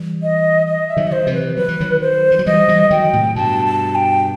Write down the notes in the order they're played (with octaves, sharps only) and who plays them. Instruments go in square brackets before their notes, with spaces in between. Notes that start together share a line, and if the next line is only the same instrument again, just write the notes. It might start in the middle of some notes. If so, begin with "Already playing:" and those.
Already playing: [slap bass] E3 G3
[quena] D#5
D#5
E5
[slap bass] D#3 F#3
[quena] D#5
C5
[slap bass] C3 E3
[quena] B4
[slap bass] F#3 [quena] B4
[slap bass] E3
D#3 F#3
[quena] C5
[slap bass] E3
F#3
[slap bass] E3 G3 [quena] D#5
[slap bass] E3 G3
[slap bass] D#3 F#3 [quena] G5
[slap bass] A2 C3
[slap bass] G2 B2 [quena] A5
[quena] A5
G5